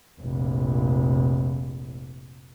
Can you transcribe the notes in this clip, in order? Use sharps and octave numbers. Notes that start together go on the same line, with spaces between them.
F1 A#1